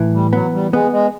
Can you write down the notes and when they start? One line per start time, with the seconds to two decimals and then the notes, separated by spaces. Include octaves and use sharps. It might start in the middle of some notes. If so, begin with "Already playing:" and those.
Already playing: A2 E3
0.13 G3
0.33 F#3 B3
0.53 G3
0.73 G#3 B3
0.93 G#3